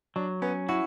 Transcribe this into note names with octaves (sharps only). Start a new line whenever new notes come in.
F#3 D4
B3 C#4
E4 F#4